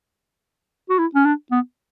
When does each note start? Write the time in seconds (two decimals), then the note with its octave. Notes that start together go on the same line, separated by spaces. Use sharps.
0.90 F#4
0.99 E4
1.15 C#4
1.25 D4
1.52 B3